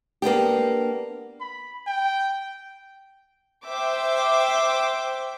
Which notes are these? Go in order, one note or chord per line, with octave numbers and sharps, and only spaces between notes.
A#3 B3 D4 G4
B5
G5
C5 E5 G5 D6